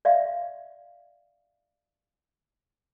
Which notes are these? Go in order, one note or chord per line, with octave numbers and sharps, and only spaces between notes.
D5 E5 F5